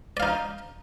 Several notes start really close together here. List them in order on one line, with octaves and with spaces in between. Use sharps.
D5 F5 D#4